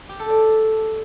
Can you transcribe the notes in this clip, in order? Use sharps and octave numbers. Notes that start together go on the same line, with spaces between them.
G4
A4
D5